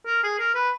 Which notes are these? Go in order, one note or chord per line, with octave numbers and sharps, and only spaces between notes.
A#4
G#4
A#4
B4